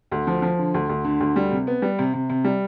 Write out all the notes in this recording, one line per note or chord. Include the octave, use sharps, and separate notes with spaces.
D2
F3
F3
D3
D2
D2
D3
D2
G3
C3
B3
G3
C3
C3
C3
G3